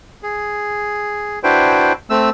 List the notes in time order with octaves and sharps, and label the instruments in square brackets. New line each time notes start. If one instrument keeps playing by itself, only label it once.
[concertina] G#4
D4 E4 F#4 B4 C5 G5
A3 C4 E6